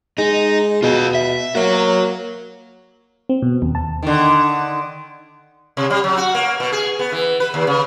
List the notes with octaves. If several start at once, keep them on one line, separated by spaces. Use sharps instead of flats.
G#3 D#4
B2 F4 D#5
E5
A#3 F#4 C#5
C4
B2
D#2
A5
D3 D#3
C3
G3
F#3
F#4
A#3
B2
G#4
B3
E3
B4
D#2
C#3